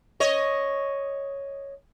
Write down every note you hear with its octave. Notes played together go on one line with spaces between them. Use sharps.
C#5 D#5